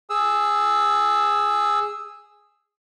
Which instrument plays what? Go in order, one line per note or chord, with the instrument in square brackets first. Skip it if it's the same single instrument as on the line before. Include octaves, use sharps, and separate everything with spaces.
[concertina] G#4 E6